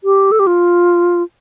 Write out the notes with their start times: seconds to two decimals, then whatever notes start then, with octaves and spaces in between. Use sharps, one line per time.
0.04 G4
0.32 A4
0.39 G4
0.47 F4